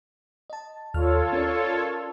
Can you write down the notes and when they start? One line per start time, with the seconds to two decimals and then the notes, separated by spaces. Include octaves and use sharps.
0.50 D#5 A5
0.94 D#2 F4 A4 C#5 F6
1.33 C#4 A#4 D5